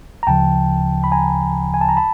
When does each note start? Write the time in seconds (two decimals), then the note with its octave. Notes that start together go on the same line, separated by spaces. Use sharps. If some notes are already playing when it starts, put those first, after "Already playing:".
0.23 A#5
0.27 D2 C#3 F3 G5 A5
1.04 B5
1.12 G#5 A#5
1.74 G#5
1.81 A5
1.89 A#5
1.97 A5 B5